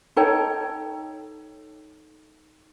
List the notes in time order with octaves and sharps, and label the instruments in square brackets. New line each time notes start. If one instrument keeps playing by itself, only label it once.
[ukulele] D#4 A4 C#5 G5